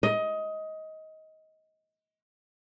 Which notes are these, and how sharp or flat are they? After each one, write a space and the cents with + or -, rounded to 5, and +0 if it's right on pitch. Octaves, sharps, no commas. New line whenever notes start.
D#5 +20